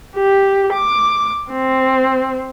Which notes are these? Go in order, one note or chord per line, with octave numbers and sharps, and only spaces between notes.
G4
D6
C4